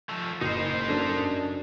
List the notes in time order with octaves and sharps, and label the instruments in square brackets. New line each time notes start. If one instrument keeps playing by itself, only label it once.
[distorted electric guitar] F3 A3
[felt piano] F#1 [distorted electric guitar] D#4 C5
[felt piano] F#2 A4 [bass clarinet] D4